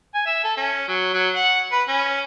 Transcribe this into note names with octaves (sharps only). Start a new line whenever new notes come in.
G#5
E5
A4
C#4
F#3
F#3
F#5
B4
C#4